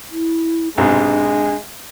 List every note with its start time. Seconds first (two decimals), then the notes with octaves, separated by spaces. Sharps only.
0.11 E4
0.77 B1 G#2 C3 G#3 D4